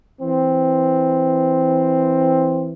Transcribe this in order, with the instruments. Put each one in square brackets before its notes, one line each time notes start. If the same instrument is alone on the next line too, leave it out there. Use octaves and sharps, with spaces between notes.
[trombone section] E3 C4